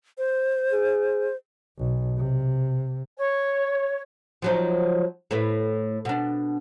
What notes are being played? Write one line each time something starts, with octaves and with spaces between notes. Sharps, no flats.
C5
G#4
B1
C3
C#5
F3 F#3 D#4
A2 E4 B4
B2 D4